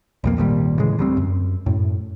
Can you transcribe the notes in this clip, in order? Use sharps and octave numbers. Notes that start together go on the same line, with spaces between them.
B1 F2 A#3
G#1 D#2 A#2 G3
A2 C#3 E3 G#3
D2 G3 C4
F#2
F#2 A2